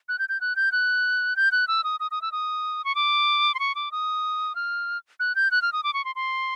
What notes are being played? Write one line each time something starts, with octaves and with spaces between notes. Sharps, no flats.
F#6
G6
G6
F#6
G6
F#6
G6
F#6
E6
D#6
D#6
D#6
E6
D#6
C#6
D6
C6
C#6
D6
D#6
F6
F#6
G6
F#6
F6
D#6
D6
C#6
C6
C6